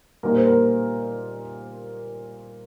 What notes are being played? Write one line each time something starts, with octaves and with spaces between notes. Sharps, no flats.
A#2 G3 A#3 D#4 A#4
C5
A#4